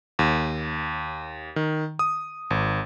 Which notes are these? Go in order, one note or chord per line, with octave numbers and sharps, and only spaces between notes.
D#2
D#3
D#6
G#1